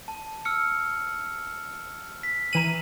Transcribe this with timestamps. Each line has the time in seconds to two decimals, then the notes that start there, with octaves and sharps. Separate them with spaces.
0.08 A5
0.45 E6 F6 C#7
2.23 B6
2.53 E3 A#5 D#7 F#7